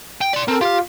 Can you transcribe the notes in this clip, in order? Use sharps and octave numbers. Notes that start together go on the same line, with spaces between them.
G5
D5 C6
C4 A4 A#4
F4 G4 F5